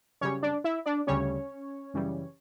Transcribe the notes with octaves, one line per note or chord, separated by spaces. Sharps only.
F#2 C#3 G3 C#4 C#5
D4 D5
E4 E5
D4 D5
D2 C#3 G3 C#4 C#5
F#2 C#3 E3 G3